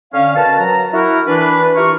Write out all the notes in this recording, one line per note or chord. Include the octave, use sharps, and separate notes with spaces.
D3 C#4 F5
B2 A#4 B4 A5
F#3 A#5
E4 F#4 A#4
E3 D4 B4
E4 F4 G4 A#4 C#6